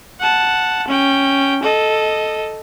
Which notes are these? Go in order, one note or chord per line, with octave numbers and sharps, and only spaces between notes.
F#5 A5
C#4 G5
A4 D#5